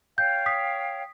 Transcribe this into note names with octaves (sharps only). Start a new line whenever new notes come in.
C#5 F5 G5 G6
D#6 B6